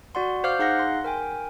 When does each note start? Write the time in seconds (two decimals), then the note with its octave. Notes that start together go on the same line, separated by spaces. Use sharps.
0.15 F#4 D5 F#5 C6
0.44 C5 F5 D6 F6 G6
0.59 D#4 G#4 F5 F#5 F#6 A#6
0.79 C6
1.04 A#4 G5 G#5